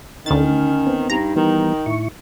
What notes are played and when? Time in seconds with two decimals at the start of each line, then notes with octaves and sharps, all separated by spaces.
0.26 D2 D#3 C#4 D#4 A6
0.87 B3 C4
1.10 G2 D#4 A#5
1.36 D#3 E3 G3 B3
1.86 A2 E4 C#6